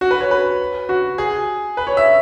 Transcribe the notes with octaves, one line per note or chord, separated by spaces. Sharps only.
F#4
B4
C#5
B4
F#4
G#4
B4
C#5
E5